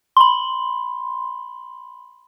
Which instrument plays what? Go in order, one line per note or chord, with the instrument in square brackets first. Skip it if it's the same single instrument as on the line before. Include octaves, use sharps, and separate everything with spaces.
[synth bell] B5 C6